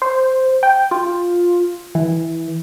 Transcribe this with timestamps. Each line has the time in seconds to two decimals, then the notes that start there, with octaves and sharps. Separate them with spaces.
0.02 C5
0.63 G5
0.91 F4
1.95 E3